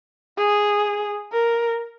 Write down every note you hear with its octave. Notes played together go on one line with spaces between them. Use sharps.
G#4
A#4